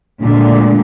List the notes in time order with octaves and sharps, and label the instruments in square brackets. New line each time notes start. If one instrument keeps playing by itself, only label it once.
[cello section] D2 A#2 D3 G#3